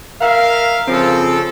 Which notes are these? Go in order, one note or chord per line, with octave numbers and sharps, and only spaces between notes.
A#4 E5 F5
C#3 F3 C4 A4